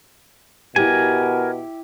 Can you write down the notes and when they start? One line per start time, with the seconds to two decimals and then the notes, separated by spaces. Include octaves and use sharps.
0.76 B2 E4 G4 A#4 G#5